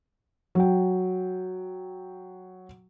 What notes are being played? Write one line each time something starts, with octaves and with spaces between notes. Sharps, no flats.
F#3 G5